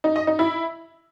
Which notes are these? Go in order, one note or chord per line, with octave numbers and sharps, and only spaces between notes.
D#4
D#5
D#4
E4